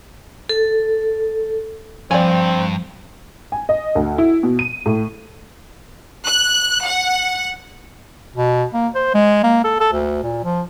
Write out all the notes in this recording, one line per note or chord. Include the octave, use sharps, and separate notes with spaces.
A4
G2 F3 C4 D5 G#5
G#5
D#5
D2
E4
B2
D#7
A2
F#6
F#5
B2
A#3
C5
G#3
A#3
A4
A4
D2
A#2
F3